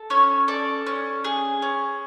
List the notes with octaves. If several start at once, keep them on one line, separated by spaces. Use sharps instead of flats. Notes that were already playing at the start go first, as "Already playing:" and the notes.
Already playing: A4
C#4 C#5
A4 D5
C#4
G#4
C#4